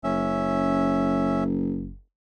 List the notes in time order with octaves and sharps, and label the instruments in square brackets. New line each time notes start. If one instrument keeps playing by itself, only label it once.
[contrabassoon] F#1 [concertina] C#4 E5